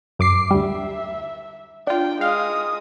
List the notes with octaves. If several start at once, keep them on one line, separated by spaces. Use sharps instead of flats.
F#2 D6 C7
D2 G3 E5
D4 F4 G5
G#3 F5 D#6